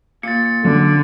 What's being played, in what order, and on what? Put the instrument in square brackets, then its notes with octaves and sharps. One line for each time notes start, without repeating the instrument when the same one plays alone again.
[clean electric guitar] A#2 [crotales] A6 C#7
[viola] D3 [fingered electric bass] F#3 C#4 D4